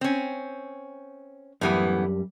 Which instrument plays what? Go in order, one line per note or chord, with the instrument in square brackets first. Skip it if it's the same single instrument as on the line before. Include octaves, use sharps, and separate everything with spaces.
[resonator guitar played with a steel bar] C4 C#4
[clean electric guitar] F#2 G3 [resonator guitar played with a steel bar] A2 E3 B3